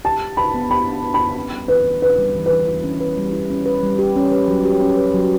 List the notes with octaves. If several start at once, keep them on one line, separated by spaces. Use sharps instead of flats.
G4 A5
D4
B4 B5
B3
G4 B5
D4
B4
B5
B3
C#4
G3
E3 B4
E3
C#4 B4
G3
E3
B4
E3
E4
C#4
B4
G3
E4
C#4
B4
G3
G4
C#4
B4
F#3
G4
C#4
B4
F#3